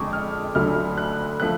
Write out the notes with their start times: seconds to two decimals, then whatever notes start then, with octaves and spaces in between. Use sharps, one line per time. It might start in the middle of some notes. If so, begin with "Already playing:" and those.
Already playing: F2 D3 G#3 C#6 D6
0.13 F6
0.55 D2 D3 F#3 A3 F6
0.98 F#6
1.40 F3 A3 F#6